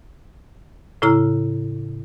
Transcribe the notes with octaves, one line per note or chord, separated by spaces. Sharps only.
A2 C#3 E4 A#5 F6